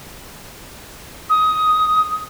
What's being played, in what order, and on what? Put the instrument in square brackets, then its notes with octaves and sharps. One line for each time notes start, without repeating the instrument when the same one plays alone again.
[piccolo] D#6